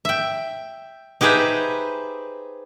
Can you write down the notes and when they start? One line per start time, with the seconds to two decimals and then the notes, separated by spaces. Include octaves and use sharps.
0.05 E5 G5
1.21 D#4 G4 G#4 B4 C5 E5